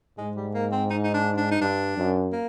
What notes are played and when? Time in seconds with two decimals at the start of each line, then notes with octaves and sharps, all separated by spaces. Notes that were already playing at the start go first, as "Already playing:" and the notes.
0.18 G#2 G#3
0.36 G3
0.54 A#3
0.72 C4
0.90 D#4
1.03 D#4
1.14 D4
1.37 D4
1.51 D#4
1.61 G2 D4
1.98 F#2
2.32 A#3